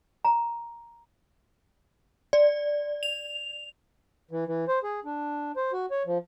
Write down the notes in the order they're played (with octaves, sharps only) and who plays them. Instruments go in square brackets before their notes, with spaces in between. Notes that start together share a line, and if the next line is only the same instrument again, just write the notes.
[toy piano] A#5
[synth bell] D5
F7
[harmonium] E3
E3
C5
G#4
D4
C5
F#4
C#5
F3